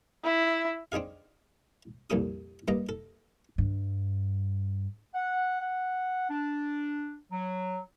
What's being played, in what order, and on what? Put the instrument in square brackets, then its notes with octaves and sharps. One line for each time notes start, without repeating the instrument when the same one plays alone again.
[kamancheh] E4
[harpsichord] C4 D4 D#4 G#4 F5
C2 F2 A#2 A4 D#6
G2 A#3 D#5 A#5
A4
[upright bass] G2
[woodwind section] F#5
F#5
D4
F#3